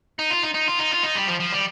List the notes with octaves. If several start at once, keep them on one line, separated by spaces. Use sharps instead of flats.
D#4
F4
D#4
D#4
F4
D#4
F4
D#4
G3
F3
F3
G3